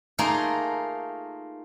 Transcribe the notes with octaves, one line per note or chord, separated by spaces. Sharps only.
A3 A#3 D#4 F4 G#4 A#4